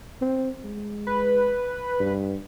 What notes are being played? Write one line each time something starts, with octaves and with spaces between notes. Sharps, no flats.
C4
G#3
B4
G2